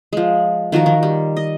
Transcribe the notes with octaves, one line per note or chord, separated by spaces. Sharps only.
F3 G#3
D#3 F3 F#4 A#4
D#3
G3
D#5